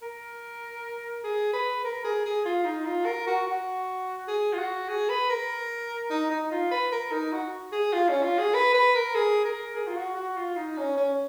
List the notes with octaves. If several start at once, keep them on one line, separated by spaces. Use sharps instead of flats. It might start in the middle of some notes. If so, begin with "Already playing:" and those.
A#4
G#4
B4
A#4
G#4
G#4
F4
D#4
F4
A#4
F#4
F#4
G#4
F4
F#4
G#4
B4
A#4
D#4
D#4
F4
B4
A#4
D#4
F#4
G#4
F4
C#4
F4
G#4
B4
B4
A#4
G#4
A#4
G#4
F4
F#4
F#4
F4
D#4
C#4
C#4